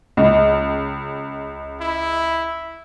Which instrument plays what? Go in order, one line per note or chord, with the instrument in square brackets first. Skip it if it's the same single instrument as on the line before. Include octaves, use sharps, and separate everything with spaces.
[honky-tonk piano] C#2
[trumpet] E4